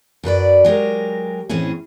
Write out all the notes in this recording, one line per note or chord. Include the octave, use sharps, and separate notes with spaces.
F#2 F#3 B4 D5
F#3 G#3 G4 A#4
A2 E3 C4 C#4 G#4